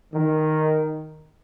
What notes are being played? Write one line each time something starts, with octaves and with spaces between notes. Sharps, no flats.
D#3